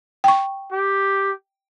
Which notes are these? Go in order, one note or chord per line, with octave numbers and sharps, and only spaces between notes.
G5 C#6
G4